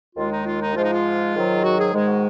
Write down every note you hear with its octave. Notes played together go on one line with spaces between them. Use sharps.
D#2 D#3 G#3 F4
D#4
F4
D#4
G#2 F3 G#3 F4
D#4
F4
G#2 D#3 F#3
F#4
G#4
G#2 D#3 G#3 G#4
F#4